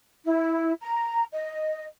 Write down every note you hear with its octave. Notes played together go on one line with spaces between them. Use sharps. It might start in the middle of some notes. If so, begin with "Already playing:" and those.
E4
A#5
D#5